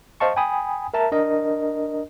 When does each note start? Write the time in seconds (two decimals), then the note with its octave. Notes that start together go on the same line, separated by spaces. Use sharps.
0.20 C5 D#5 F5 A5 C#6
0.36 G5 G#5 B5 D#6
0.94 A#4 E5 A5 A#5
1.12 D4 A#4 D#5